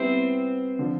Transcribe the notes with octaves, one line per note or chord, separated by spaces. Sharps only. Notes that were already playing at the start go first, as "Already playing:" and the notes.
Already playing: G3 B3 C4 E4 C5
D3 F3